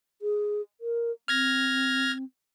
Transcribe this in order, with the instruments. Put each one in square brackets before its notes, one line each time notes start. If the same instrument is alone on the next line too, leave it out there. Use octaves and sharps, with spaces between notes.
[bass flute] G#4
A#4
[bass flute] C4 [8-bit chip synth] F6 G#6 A#6